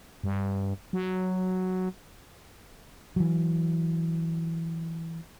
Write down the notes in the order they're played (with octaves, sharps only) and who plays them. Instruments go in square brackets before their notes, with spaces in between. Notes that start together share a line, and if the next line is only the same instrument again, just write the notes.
[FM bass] G2
F#3
[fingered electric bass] E3 F#3